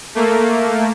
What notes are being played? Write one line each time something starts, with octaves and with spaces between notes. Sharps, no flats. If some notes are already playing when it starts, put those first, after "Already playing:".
A3 A#3